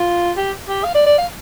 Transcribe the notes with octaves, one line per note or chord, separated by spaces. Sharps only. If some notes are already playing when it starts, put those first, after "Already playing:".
Already playing: F4
G4
G4
F5
D5
D5
F5